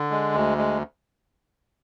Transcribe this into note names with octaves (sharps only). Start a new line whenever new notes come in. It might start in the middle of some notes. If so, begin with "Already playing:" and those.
Already playing: D3
G#3
D2
G#3